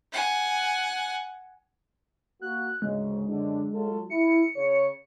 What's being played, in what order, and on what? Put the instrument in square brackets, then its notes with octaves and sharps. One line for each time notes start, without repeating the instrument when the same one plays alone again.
[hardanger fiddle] F#5 G#5
[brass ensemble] A#3 F#4 [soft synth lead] F#6
[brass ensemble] D2 G#2 C#3 [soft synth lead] G#3
[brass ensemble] F#2 D3 D4
F#3 F4 A4
[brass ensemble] E4 [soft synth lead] C#7
[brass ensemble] C#3 C#5